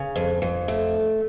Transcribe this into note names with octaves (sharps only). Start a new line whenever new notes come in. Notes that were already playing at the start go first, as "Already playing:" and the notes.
Already playing: C#3
F2
F2
A3